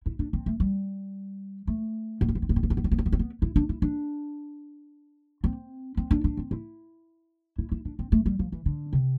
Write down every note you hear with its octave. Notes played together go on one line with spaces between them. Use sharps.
E4
D4
C4
A3
G3
A3
B3
C4
B3
C4
B3
C4
B3
C4
B3
C4
B3
C4
B3
C4
B3
E4
D4
E4
D4
C4
C4
D4
D4
C4
E4
E4
E4
D4
C4
A3
G3
F3
E3
D3
C3